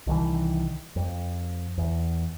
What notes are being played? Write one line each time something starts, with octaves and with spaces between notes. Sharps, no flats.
C2 D#3 E3
F2
E2